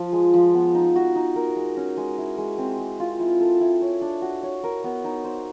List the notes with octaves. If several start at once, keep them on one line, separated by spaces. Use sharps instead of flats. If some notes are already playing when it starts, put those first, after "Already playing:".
Already playing: F3
G#3
F3
B3
D#4
F#4
D#4
A#4
G#3
C#4
G#3
E4
G#3
C4
G#3
F4
E4
A4
E4
C#5
D4
F#4
C#5
A#4
B3
D#4
C5